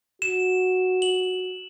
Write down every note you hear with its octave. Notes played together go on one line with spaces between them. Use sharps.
F#4 E7
F#7